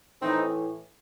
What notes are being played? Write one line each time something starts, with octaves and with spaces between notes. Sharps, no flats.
A2 E3 C4 D#4